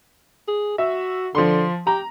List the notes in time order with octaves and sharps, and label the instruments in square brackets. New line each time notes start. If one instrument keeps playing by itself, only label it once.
[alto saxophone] G#4
[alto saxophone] F#4 [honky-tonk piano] E5
[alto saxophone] D3 [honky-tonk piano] F3 C6
[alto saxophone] G4 [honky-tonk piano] A#5